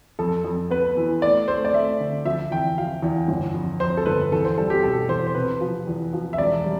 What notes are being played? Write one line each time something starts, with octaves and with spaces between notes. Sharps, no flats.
F2 A4
F2
B3 B4
E3
A3 D5
A3 C5
D5
A3 E5
D3
F3 E5
E2 G5
F3 F5
E2
G1
F2
F2 C5
A4
G1 B4
E2 A4
C5
G3 A4
G4
B2 A4
E2 C5
C5
C3 B4
F3
E2
F3
E5
E1 D5
G3